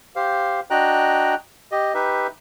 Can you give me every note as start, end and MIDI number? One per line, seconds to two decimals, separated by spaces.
0.16 0.60 67
0.16 0.60 72
0.16 0.60 77
0.70 1.35 62
0.70 1.35 66
0.70 1.35 75
0.70 1.35 79
0.70 1.35 82
0.70 1.35 90
1.72 1.94 67
1.72 1.94 75
1.94 2.27 63
1.94 2.27 67
1.94 2.27 71
1.94 2.27 76